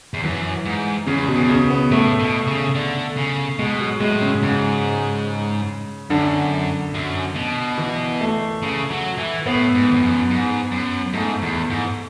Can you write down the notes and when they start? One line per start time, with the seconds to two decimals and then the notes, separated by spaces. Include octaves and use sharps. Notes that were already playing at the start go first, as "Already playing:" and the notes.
0.14 E2
0.23 F#2 E3
0.65 G#2
1.06 E2 C#3
1.28 B2
1.35 E2
1.50 C#3
1.70 B3
1.91 A2 A3
2.19 B2
2.47 C#3
2.75 D3
3.17 C#3
3.59 B2 G#3
3.80 F#3
4.00 A2 G#3
4.22 C#3
4.42 G#2 C#3
6.10 F#2 D3
6.94 F#2
7.36 B2
7.78 E3
8.21 A3
8.62 C#3
8.91 F#3
9.18 E3
9.46 A2 B3
9.75 G#2
9.91 E2
10.02 F#2
10.31 G#2
10.72 F#2
11.13 G#2 A3
11.42 E2
11.70 G#2